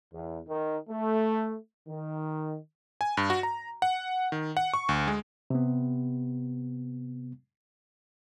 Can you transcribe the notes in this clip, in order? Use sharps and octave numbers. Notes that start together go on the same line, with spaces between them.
E2
D#3
A3
D#3
G#5
G2
F#4
A#5
F#5
D#3
F#5
C#6
D2
G#3
C3 B3